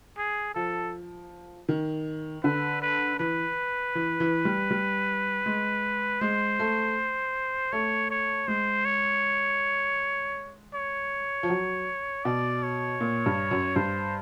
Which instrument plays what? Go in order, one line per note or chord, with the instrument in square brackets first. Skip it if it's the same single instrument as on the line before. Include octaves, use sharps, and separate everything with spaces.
[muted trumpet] G#4
[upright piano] F3 [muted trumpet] A4
[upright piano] D#3
[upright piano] D3 [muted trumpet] B4
[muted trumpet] B4
[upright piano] E3 [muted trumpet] B4
[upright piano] E3
E3
G3
G3
G#3
[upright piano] G#3 [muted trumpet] C5
[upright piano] A3
[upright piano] A3 [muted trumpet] C#5
[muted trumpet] C#5
[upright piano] G#3 [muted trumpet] C5
[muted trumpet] C#5
C#5
[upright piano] F3
F#3
[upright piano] B2 [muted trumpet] D5
[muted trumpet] C#5
[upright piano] A#2
G2
F#2
[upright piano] G2 [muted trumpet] C5